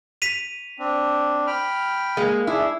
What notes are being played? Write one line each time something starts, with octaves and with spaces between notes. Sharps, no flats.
B6 D#7 F7
C4 D4
G5 B5 F6
G#3 A#3
D4 E4 G#4